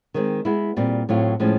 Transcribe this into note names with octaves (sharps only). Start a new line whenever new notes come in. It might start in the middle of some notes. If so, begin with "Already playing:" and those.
D#3 G#3 C4
G#3 B3 E4
A#2 G3 C4
A2 F#3 A3 C4 F4
A2 F3 G#3 C#4